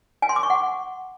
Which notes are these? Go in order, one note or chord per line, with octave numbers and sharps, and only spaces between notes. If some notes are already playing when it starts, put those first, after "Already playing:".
G#5
C6
D6
C#6
F#5